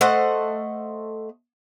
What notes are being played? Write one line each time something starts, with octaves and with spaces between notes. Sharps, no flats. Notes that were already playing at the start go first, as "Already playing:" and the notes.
A3 C5 D#5 F#5